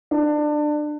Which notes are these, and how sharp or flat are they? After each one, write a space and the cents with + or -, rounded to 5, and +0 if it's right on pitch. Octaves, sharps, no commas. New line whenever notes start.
D4 +25